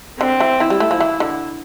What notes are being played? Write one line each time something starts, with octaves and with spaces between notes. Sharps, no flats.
D3 C4
E3
E3 E4
G3
A3
F3
E3
D3